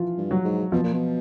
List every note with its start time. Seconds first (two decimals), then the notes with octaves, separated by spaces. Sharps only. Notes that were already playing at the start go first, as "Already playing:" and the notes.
Already playing: E3 F3 F4
0.17 G2
0.31 F#3 F#4
0.45 G#2
0.72 B2 F3 F4
0.83 A#2
0.94 B2